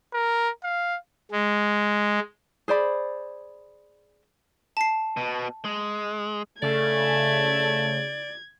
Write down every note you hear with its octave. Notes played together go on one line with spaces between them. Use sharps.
A#4
F5
G#3
G#4 C5 D5 B5
A5 C7
B2
G#3
C#3 A3 D5 G#6